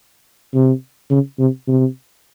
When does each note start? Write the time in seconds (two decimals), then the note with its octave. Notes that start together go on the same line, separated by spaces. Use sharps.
0.54 C3
1.11 C#3
1.39 C3
1.68 C3